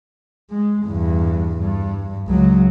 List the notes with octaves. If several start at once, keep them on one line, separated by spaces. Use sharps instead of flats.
G#3
E2 G2
G2
C#2 F#3